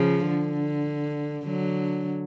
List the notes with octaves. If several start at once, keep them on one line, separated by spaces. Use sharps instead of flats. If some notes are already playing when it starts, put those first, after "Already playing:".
Already playing: C#3 F3
D3
D3 F#3